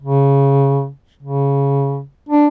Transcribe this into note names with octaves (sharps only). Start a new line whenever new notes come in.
C#3
C#3
D4